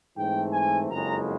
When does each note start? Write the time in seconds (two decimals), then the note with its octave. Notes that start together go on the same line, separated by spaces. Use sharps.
0.16 G#2 E3 A3 C4 G5
0.53 G#5
0.90 F#1 F2 C#3 F3 G#3 A#5